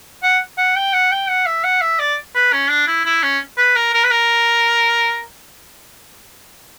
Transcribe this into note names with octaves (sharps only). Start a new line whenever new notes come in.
F#5
F#5
G5
F#5
G5
F#5
E5
F#5
E5
D5
B4
C#4
D4
E4
E4
C#4
B4
A#4
A#4
B4
A#4